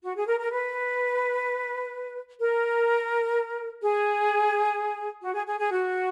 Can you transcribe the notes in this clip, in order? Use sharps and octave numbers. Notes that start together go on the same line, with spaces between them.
F#4
G#4
A#4
A#4
B4
A#4
G#4
F#4
G#4
G#4
G#4
F#4